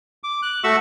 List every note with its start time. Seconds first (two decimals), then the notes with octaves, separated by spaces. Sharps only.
0.24 D6
0.43 F#6
0.64 A3 F#4 E5 C#6 E6